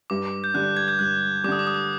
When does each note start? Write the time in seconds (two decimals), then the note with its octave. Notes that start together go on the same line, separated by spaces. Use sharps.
0.10 G2 D6
0.44 G6
0.54 D3 G3 F#6
0.77 G#6
0.88 G6
0.99 G2 F#6
1.44 G3 D6
1.48 D3 D#6
1.59 D6
1.67 D#6
1.75 D6